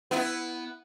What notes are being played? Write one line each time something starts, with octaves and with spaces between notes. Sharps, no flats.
B3 E4